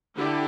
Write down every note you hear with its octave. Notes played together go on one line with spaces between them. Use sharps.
D3 E4 G4